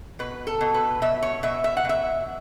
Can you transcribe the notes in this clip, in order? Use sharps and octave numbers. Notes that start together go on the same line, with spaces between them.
B2 B4
A4
B2
B4
B2 E5
C#5
B2 E5
E5
F#5
B2 E5